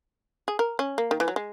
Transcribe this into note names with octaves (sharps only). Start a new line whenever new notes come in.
G#4
A#4
C#4
A#3
D#3
E3
F#3
G#3